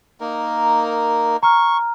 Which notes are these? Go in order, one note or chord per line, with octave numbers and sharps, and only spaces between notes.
A#3 D#4 A#4
A#5 C#6 F6